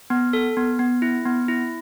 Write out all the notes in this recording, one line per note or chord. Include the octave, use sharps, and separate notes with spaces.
B3
A4
B3
B3
E4
B3
E4